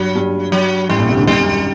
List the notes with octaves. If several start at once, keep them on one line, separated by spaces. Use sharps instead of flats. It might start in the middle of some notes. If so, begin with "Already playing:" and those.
Already playing: G2 F#3
G2
F#3
A1 A2 G3
A#1 A#2
C2 C3
D2 D3
D#2 D#3 G3
F#2